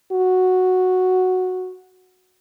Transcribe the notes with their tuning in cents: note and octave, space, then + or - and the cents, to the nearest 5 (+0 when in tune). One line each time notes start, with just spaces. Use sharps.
F#4 -5